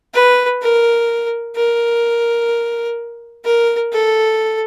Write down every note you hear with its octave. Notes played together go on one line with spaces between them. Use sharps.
B4
A#4
A#4
A#4
A4